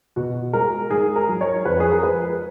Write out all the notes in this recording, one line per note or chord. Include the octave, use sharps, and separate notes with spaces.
B2 F#4
G#3 A#4
G#2 G#4
A#4
F#3
C#5
F2 B4
G#4
A#4
F3 G#3 B4